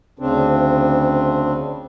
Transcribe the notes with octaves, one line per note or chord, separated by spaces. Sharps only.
D2 C#3 C4 D4